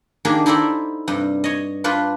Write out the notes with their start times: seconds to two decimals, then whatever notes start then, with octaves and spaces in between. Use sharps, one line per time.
0.25 D#3 A#3 D4 G4 G#4
0.46 D#4 E4 A4 C5 D5 E5
1.08 G2 C3
1.44 C#5 D#5
1.84 D4 F4 B4 C5